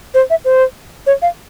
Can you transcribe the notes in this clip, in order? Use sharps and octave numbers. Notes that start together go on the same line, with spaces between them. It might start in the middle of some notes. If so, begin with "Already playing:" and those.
C5
E5
C5
C#5
F5